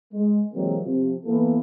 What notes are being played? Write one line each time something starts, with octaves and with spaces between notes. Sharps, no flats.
G#3
C3 E3 F#3 G#3 A#3 C4
C3 F3
E3 A#3 B3 A4 B4